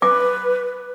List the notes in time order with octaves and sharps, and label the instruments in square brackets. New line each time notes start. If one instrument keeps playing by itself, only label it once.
[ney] B4 [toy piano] D6